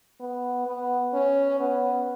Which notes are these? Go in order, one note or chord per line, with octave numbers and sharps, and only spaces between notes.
B3
B3
C#4
B3